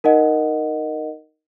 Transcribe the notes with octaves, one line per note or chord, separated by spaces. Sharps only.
D#4 A#4 D#5 F#5